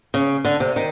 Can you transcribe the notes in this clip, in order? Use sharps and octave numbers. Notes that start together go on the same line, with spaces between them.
C#3
D3
C3
D#3